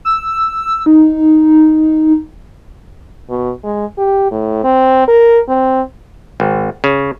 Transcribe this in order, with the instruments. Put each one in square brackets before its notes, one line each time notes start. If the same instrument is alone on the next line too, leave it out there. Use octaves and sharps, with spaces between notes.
[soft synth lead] E6
D#4
[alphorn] B2
G#3
G4
A2
C4
A#4
C4
[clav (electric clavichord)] G#1
C#3